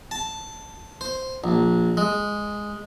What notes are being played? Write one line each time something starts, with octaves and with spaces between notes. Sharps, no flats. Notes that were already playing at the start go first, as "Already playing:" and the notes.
A5
C5
A#1
G#3